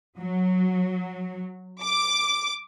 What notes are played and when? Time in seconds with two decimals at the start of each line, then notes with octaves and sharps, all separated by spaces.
0.19 F#3
1.82 D6